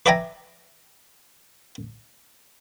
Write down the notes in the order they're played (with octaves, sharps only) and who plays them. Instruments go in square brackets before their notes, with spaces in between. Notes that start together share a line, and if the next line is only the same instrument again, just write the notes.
[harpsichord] B4 D5 E5 G5 G#5 A#5